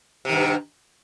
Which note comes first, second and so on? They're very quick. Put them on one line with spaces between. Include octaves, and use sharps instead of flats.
C3 D#3 G2